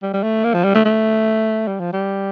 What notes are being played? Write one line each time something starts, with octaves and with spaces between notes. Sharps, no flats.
G3
G3
A3
A#3
F3
G3
A3
A3
G3
F3
G3